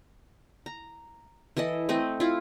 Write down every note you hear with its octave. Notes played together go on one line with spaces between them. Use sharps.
A#5
E3 E4 A4 D#5
A3 C4 D#5
E4 F4